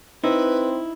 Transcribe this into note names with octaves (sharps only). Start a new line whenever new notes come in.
C4 D#4 E4 B4